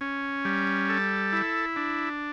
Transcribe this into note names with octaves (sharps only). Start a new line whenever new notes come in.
C#4
G3
A4
E4
D4